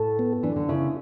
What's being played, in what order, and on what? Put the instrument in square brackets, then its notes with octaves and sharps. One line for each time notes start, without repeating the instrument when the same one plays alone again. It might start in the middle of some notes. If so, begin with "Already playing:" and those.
Already playing: [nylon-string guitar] A2 [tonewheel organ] A4
[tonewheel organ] B3
[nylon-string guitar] E3 [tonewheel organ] D4
[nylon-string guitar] D3
[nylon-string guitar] C#3 [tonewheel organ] E4